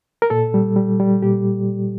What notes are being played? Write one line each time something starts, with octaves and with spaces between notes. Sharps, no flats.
A#4
A#2 A4
G3
G3
G3
A#2 G4